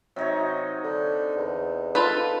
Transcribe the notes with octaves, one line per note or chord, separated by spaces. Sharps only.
C3 F#3 D#4 C#5
D3
E2
F4 A4 B4